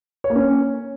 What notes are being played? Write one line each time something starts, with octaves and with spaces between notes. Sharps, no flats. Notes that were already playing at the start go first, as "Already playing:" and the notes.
C#5
A#3
C#4